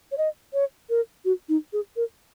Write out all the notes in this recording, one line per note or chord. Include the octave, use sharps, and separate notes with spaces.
C#5
D#5
C#5
A#4
F#4
D#4
G#4
A#4